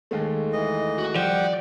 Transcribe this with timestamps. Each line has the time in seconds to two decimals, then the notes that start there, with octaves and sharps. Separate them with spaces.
0.11 D#2 G#3 A3
0.53 E3 D#5
0.99 F#4
1.16 F3 G3 D5 F#5 G5